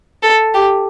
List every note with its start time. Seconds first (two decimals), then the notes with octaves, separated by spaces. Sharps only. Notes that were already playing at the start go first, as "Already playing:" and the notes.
0.23 A4
0.54 G4